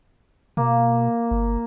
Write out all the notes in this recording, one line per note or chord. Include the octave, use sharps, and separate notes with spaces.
B2 A#3
G1